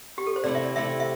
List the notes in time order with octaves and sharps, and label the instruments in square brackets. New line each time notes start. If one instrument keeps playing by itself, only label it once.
[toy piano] G4
A4
C5
[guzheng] C3 A3 E4 [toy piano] D5
[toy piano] E5
D5
[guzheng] C3 A3 E4 [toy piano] E5
[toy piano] E5